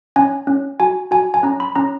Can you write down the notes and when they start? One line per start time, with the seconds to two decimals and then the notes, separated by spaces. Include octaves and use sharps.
0.16 C#4 G#5
0.47 C#4
0.80 F#4 G#5
1.11 F#4 G#5
1.34 G#5
1.43 C#4 A#5
1.60 B5
1.76 C#4 A#5